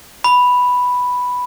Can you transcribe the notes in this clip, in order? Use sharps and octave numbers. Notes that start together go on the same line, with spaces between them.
B5